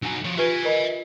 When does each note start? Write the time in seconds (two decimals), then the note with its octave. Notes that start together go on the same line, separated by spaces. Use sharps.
0.02 F#3 D4 D#4 G#5
0.25 F3 C#5
0.37 F4 G4 B4 E5 G#5
0.65 A#4 D#5 B5